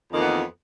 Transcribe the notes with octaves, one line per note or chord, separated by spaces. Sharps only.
F2 D#3 E3 A#3 B3